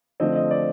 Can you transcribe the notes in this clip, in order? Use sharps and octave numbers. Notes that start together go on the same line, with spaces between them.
D3 F3 A3 C4 D#5
D#5
D5